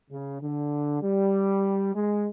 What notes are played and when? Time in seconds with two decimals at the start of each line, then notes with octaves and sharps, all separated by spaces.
0.11 C#3
0.42 D3
1.02 G3
1.95 G#3